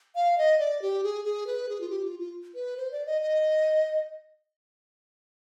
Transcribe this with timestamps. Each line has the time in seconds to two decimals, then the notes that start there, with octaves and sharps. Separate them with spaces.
0.16 F5
0.38 D#5
0.59 D5
0.82 G4
1.03 G#4
1.25 G#4
1.47 B4
1.69 G#4
1.81 F4
1.90 G4
2.05 F4
2.19 F4
2.55 B4
2.77 C5
2.92 D5
3.06 D#5
3.21 D#5